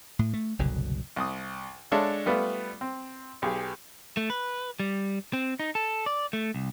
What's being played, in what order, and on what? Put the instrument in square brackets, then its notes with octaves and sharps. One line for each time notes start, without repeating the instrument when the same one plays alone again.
[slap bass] A2
A3
F#1 C2 B2 D3
[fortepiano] C2 D#6
G#3 D4 A4 C#5 E5 F5
G3 A3 B3 F4 B4
C4
B1 G4 G#4
[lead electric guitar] A3
B4
G3
C4
D#4
A4
D5
A3
C2